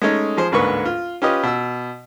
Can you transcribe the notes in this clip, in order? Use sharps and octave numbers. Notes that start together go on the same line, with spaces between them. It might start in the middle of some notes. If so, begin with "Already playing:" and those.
G#3 A3 C#4 D#4
F3 G#4 C5
A1 D2 G#2 A#3 B4 C#6
F4
C#4 F4 G4 B4 D#5
B2 E6